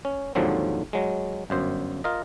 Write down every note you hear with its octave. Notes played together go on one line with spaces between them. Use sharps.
C#4
D#2 G#2 D3 F3 F#3 C4
F#3 G#3
G1 F#2 C5
F4 A#4 D#5